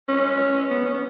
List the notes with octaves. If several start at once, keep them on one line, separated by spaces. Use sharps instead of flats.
C#4
B3
C#4
B3